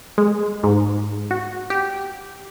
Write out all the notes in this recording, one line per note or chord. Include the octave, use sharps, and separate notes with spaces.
G#3
G#2
F#4
G4